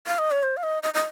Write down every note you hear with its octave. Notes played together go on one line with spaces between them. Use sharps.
F5
D#5
C#5
C5
F5
D#5
D#5
D#5